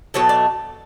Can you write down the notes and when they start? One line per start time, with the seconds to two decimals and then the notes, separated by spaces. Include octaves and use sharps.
0.14 B2 F#3 A3 C#5
0.29 D5